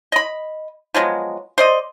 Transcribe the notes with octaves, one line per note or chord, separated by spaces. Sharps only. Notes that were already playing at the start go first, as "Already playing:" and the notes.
D#5 B5
F3 F#3 G#3 B3
C5 D5 D#5